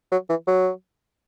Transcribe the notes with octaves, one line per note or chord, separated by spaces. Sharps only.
F#3
E3
F#3